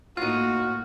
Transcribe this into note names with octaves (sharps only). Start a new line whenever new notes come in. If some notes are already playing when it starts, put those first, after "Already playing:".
A2 A#3 D#4 F4 F#4 F6